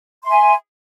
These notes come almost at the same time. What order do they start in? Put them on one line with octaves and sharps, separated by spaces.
C6 E5 G#5